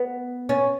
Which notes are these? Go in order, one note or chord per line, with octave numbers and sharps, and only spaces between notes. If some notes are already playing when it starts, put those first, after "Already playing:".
Already playing: B3
C#4